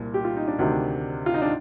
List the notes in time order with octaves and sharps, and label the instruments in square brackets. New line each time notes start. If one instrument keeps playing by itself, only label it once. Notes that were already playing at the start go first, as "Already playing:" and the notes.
Already playing: [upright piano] C2 A#2
G4
F4
D#4
D4
D2 C3 D#3
F4
D#4
D4